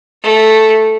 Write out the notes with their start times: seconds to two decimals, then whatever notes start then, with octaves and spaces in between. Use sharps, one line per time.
0.23 A3